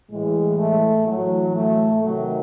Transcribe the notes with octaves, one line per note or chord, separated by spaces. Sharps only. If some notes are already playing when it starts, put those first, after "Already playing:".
A2 E3 G#3
A3
A2 E3 F#3
A3
C3 D#3 F#3